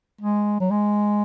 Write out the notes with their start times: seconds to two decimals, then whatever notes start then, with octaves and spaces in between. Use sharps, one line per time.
0.21 G#3
0.60 F#3
0.71 G#3